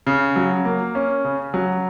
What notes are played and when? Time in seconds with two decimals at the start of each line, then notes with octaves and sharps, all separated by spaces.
0.07 C#3
0.36 F#3
0.65 A#3
0.95 C#4
1.25 C#3
1.54 F#3